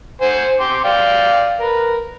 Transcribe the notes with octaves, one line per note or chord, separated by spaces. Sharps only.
C5 F#5 G#5
G5 C6 D6
D5 F5 G5
A#4 B4